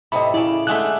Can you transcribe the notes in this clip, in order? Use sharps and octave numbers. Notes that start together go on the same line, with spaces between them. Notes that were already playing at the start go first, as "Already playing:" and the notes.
A2 C3 D#5 B5
C#3 E4 D5
D3 G#3 A3 F#6